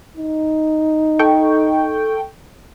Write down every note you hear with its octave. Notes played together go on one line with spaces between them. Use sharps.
D#4
A4 G5 C#6